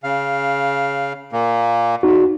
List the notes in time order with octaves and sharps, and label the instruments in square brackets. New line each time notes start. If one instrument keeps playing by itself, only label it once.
[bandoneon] C#3 F5
A#2 A#3
[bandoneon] E2 [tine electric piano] D#4 F#4